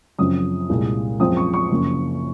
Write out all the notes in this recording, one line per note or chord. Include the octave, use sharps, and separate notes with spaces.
F#1 F#2 C#3 F3 C4 D#6
C2 A#2 G#3
F#2 F3 G#3 C4 D#6
C#6
C#6
F#1 F#2 F3 A#3